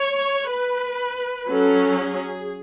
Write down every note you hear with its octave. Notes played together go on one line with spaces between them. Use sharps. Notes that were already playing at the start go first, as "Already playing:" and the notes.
Already playing: C#5
B4
F#3 C#4 A4
G#4